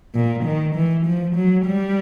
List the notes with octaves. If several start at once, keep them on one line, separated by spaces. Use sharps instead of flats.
A#2
D#3
E3
F3
F#3
G3